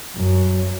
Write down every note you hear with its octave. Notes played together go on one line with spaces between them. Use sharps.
F#2